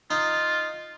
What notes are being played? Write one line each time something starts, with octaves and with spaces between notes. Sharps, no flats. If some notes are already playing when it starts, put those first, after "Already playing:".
D#4 F4